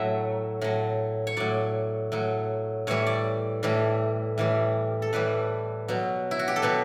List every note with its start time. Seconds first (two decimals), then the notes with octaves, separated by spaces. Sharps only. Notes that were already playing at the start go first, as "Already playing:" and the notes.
Already playing: A2 F#3 E5
0.61 A2 F#3
1.27 C#5
1.37 A2 F#3 D5
2.12 A2 F#3
2.87 A2 E3 G3 C#5
3.07 D5
3.63 A2 E3 G3
4.38 A2 E3 G3
5.02 A4
5.13 A2 E3 G3 B4
5.88 B2 F#3
6.31 E4
6.39 F#4
6.48 G4
6.56 A4
6.62 B2 F#3 B4